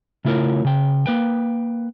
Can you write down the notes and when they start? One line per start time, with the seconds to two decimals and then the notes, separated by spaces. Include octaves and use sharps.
0.25 C#3 A3 E4 F4 A#4 C#5
0.65 C#3 G5
1.06 A#3 B4 G5